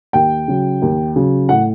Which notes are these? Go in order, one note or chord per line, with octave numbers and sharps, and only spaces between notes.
D#2 G5
C#3 F#3
D#2
C#3 F#3
A2 F#5